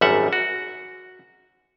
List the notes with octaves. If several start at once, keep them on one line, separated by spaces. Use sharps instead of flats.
G#1 F#2 G3 E5 F#5
F#4